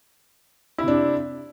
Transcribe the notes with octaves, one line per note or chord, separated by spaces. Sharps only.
C3 C4 D4 E4